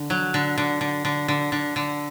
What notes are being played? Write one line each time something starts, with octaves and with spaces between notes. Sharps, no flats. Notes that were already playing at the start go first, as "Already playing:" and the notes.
Already playing: D3
F#3
D3
D3
D3
D3
D3
D3
D3